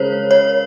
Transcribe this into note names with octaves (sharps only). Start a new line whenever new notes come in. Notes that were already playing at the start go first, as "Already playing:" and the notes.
Already playing: C#3 G#3 A#4 C5 C#5
C#5